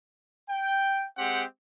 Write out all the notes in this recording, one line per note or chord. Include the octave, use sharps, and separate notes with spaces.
G5
G#3 C4 G4 F#5